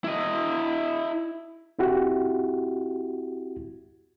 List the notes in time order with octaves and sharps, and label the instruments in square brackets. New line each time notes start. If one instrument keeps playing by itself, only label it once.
[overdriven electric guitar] E4 D#5
[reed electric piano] C4 E4 F#4 G4